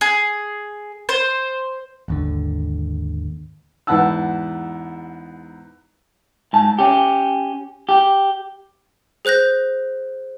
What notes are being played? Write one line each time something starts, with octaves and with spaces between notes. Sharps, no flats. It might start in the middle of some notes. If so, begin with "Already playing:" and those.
G#4
C5
G#1 D#2 D3
E2 G#2 B4 F#5 A5 E6
G#2 A5
C#4 G4
G4
G#4 C5 F#6 G6 A#6